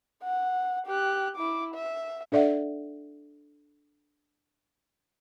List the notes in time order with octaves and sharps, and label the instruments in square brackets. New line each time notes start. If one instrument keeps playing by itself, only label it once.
[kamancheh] F#5
G4 F#6
E4 D6
E5
[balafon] D4 A4 D5 E5 F#5